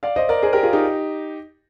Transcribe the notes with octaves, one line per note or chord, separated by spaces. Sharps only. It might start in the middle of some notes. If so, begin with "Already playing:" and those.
D5 F5
C5 D#5
A#4 D5
G#4 C5
G4 A#4
F4 G#4
D#4 G4